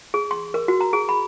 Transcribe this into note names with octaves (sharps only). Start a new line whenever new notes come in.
G#4
C6
A#4
F#4
A#5
G#4
B5